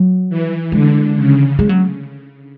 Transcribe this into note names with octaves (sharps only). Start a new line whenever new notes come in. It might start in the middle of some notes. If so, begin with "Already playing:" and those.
Already playing: F#3
E3
D3 G#3
C#3
G#3
F#3